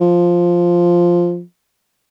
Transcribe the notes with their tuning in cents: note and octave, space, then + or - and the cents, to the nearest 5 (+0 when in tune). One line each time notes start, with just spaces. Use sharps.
F3 +0